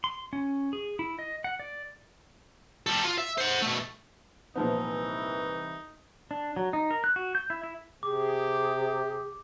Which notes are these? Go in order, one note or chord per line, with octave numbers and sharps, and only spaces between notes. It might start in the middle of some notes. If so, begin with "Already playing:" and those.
C6
C#4
G#4
E4
D#5
F#5
D5
G3 A4
F4
E5
C5 F#5
B2 A3
C2 A#2 E3 F3 B3 D#4
D4
F#3
D#4
A#4
F#6
F#4
G6
E4
E4
C3 G4 G#4 D6